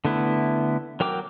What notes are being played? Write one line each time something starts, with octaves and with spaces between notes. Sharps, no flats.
D3 A3 B3 E4
F#3 A#4 G5 D6